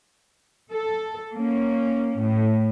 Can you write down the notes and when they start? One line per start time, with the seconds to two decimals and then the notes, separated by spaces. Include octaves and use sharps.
0.72 A4
1.33 A#3 C#4
2.17 A2